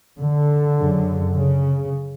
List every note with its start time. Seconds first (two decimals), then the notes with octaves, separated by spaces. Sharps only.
0.19 D3
0.76 F#2 C#3
1.34 C#3